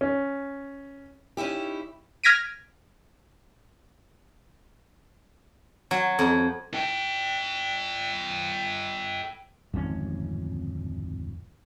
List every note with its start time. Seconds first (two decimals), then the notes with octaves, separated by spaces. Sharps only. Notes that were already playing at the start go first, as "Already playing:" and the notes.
0.01 C#4
1.37 C#4 D#4 E4 G4
2.24 F6 G#6 A#6 B6 D7 D#7
5.91 F#3
6.19 F2
6.74 A4 G5
9.74 D1 G#1 F2 C#4